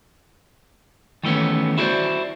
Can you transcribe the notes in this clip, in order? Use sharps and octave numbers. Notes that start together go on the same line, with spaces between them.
D#3 E3 A3 B3 C#4
E4 F#4 G4 A#4 C5 D5